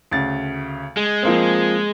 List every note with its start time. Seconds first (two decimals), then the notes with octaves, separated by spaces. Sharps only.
0.11 D2 C#3 A6
0.97 G#3
1.23 F3 A#3 C4